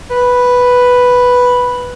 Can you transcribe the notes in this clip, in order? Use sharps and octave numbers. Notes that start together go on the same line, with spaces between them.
B4